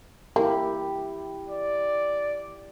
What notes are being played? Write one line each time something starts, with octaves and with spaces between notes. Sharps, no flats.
A#3 E4 G4
D5